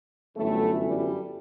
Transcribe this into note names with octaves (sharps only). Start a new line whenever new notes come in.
G1 F#2 A2 E3 A3
G3